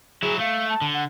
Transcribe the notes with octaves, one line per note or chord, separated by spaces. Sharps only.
F#3 E4 G#4
A3 F5
A5
D3
F#5